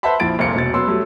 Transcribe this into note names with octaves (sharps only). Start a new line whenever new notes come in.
B4 C5 E5 F#5 A5 B5
A#1 F3 E4 A6 D7
F1 C2 A#3 C5 C#7
E1 B2 A6
F#3 B3 C#4 C6 E6
F#3 G3 A3